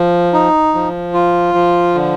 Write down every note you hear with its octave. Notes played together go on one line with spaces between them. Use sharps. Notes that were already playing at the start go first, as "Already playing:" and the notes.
Already playing: F3
D#4
F3
F4
F3
D3